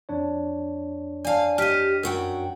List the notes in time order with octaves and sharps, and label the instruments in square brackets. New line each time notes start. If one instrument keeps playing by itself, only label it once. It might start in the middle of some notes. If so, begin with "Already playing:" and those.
[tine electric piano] F2 D4 C#5
[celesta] D5 A5 [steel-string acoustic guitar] F5 G#5
[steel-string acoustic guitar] G4 D#5 [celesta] F6 B6 D#7
[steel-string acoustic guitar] F#2 F#4 G5 [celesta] A#4